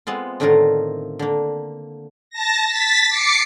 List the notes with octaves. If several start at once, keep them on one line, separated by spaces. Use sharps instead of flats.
G#3 B3 C4 F4
A2 D3 D#3 D#4 F4 A#4
D3 A#3
A5 A#6
A6 B6
D6 C7 C#7